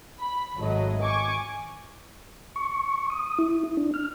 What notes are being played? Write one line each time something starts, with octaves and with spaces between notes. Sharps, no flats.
B5
G#1 F#3 A3 D#5
G#5 C#6 D6
C#6
D#6
E4
D4
F6